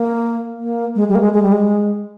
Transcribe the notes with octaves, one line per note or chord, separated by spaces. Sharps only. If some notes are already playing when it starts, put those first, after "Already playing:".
Already playing: A#3
A#3
G#3
G3
A#3
G#3
G#3
G3
G#3